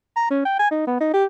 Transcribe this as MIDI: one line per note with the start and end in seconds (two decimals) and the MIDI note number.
0.16 0.28 82
0.31 0.45 61
0.45 0.57 79
0.59 0.69 80
0.71 0.84 63
0.87 0.97 59
1.01 1.12 63
1.14 1.25 67